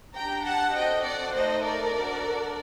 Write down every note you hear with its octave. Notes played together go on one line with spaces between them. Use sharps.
D4 G4 G5 A#5
F#5 A5
C4 F#4 A4 D#5 G5
D5 F#5
A3 D#4 A4 C5 D#5
A#4 D5
D4 F#4 A4